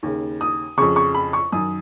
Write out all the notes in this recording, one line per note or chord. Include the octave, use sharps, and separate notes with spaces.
D#2 C#3
D#6
F2 C#3 C#6
C#6
B5
C#6
F#2 D#3 D#6